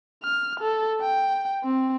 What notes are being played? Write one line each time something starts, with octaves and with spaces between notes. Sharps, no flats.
F6
A4
G5
C4